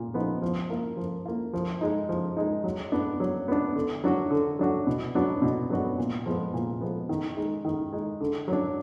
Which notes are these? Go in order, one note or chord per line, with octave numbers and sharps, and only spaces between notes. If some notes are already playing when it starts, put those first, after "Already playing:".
Already playing: A#2
F3 B3 D#4
F3
A#3 F4
F3
A#3 F4
F3
G#3 D#4
F3
G#3 D#4
F#3
B3 D4
F#3
B3 D4
D3
F#3 D4 F#4
D3
F#3 D4 F#4
B2
F#3 B3 D4 F#4
B2
F#3 B3 D4 F#4
A#2
F3 G#3 B3
A#2
F3 G#3 B3
D#3
G#3 D#4
D#3
G#3 D#4
D3
F#3 D4